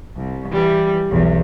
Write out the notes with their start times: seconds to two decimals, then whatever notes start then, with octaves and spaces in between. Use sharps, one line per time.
0.16 C2
0.49 E3 G3
1.09 B1 E2